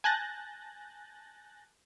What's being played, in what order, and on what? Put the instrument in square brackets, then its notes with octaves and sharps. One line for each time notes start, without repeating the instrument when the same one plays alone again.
[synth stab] G#5 A5 F#6 G6 A6 A#6